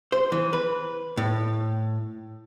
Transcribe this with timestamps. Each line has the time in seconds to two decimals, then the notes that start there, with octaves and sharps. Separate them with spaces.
0.12 C5
0.32 E3
0.53 B4
1.17 A2